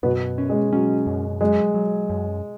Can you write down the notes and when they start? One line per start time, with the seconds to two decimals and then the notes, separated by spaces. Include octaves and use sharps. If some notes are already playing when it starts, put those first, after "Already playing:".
0.03 F#2 B2 B3
0.38 C#4
0.49 G#3
0.73 F#3 C#4
1.07 F#2
1.41 F#3 G#3
1.74 F#3
2.10 F#2